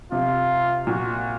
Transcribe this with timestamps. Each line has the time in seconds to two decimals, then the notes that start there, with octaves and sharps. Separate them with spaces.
0.12 C3 F4
0.87 A#2 F#4